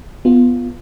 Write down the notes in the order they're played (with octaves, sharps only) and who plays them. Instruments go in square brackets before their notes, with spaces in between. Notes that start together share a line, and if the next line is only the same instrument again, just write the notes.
[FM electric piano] B3 F4